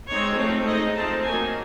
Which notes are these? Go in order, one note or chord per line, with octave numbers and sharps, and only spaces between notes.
G#3 C4 D#4 C#5
F3 A3 C4 D#4
G#3 C4 D#4 D#5
F3 A3 C4 D#4 A5
F#3 A#3 D#4 G#5